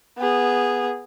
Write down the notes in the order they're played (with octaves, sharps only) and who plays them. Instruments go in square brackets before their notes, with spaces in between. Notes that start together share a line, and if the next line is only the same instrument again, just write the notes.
[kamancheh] B3 G#4